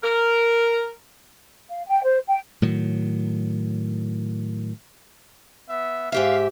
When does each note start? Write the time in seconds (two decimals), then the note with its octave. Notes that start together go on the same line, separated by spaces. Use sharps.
0.03 A#4
1.70 F5
1.86 G5
2.03 C5
2.28 G5
2.62 A2 D#3 F#3
5.69 B3 E5
6.12 G#2 G4 E5 F5